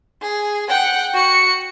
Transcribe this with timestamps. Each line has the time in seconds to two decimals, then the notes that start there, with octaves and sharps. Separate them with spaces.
0.22 G#4
0.69 F#5 G5
1.14 F#4 C#7